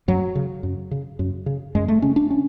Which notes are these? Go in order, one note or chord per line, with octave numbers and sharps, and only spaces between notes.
F#2 F#3
C#3
F#2
C#3
F#2
C#3
F#2 G#3
A3
C#3 C#4
D4
C#4